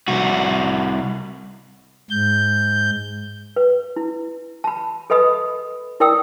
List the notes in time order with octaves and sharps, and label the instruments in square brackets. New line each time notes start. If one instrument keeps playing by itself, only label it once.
[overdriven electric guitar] C2 F#4
[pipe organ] G#2 G6
[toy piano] B4
E4
A5 B5
A4 B4 D#5 B5 D#6
E4 A#4 D5 G5 D#6 E6